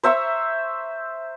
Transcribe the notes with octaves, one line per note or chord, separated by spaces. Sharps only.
C5 E5 A#5 C#6